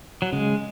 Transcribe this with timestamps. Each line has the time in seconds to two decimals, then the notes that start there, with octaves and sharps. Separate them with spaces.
0.22 F#3
0.32 C#3 G#3